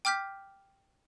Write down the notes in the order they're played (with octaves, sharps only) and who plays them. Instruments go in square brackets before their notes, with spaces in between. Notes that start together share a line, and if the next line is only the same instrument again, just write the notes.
[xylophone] G5 D6 F6 G6 B6